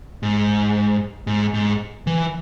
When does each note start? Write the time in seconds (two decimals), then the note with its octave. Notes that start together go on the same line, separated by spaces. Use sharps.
0.23 G#2
1.27 G#2
1.54 G#2
2.07 E3